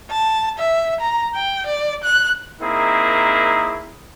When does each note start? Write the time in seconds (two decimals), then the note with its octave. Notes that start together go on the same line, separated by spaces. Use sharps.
0.11 A5
0.59 E5
1.01 A#5
1.35 G5
1.66 D5
2.04 F#6
2.60 A#3 C4 D#4 E4 G#4 A#4